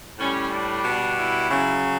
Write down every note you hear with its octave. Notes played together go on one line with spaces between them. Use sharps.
A2 G3 C#4
D4
B2 G3
E4
C#3 F#3